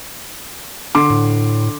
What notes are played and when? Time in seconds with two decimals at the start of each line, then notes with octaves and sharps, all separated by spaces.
0.95 D3 C6 D6
1.10 A2